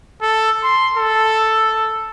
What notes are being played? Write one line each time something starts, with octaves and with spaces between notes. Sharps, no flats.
A4
C6
A4